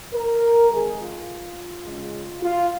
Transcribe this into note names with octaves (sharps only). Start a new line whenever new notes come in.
A#4
F2 D#3 G#3 G#4
F4
C#3 G#3 C#4
F4